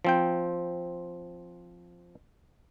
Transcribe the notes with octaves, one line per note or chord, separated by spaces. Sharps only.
F3 C4 G5